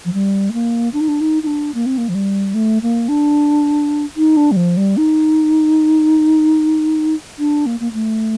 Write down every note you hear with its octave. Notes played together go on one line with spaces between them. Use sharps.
F3
G3
A3
A#3
D4
D#4
D4
D#4
D#4
D4
A#3
C4
A#3
F3
G3
A3
A#3
D4
D#4
D4
G3
F3
G3
D#4
D4
A#3
A#3
A3